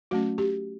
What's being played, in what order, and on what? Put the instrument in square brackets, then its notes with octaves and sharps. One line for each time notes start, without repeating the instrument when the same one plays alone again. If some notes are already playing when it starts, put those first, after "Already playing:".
[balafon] F#3 A3 C#4 F#4
G4